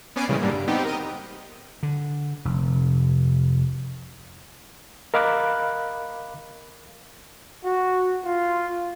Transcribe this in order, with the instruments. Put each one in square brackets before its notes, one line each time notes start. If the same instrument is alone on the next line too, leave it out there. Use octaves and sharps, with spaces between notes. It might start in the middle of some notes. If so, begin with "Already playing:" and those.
[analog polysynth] B3 C#4 D5 G#5 C7 D7
A#2 C#3 E3 G3 G#3
G#2 D3 G3 A#3
G2
B3 C4 D#4 G4
A#4 D#5 D#6
[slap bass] D3
F1
[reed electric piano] A#4 D#5 F5 B5 D6 F#6
[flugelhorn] F#4
F4